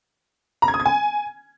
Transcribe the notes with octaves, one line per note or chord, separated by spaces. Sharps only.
A#5
G#6
D#6
G#6
G#5